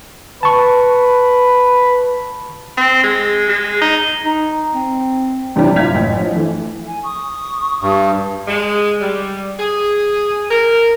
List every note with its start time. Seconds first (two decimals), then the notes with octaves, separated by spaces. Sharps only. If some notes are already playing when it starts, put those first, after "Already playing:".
0.43 B4 A5 B5 C#6
2.77 C4
3.04 G#3
3.49 G#3
3.81 D#4
4.25 D#4
4.73 C4
5.56 G2 C3 E3 F3 G3
5.76 F#2 E4 F4 G#6 B6 F7
5.94 A1
6.19 F3
6.36 E3 A3
6.86 G#5
7.03 C#6 D#6
7.82 G2
8.48 G#3
9.01 G3
9.59 G#4
10.51 A#4